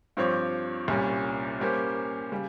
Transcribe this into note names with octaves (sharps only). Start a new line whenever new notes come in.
G2 F3 C4 G4 C#5
C2 A#2 G3 C#4
G3 A#3 C#4 G4 C5
C#3 G3